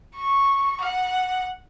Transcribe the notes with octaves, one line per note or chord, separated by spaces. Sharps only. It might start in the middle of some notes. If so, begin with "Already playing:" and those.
C#6
F#5